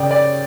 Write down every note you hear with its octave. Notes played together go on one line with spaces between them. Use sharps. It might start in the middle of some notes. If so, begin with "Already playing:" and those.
Already playing: C#3 C#4 D5 G5
D5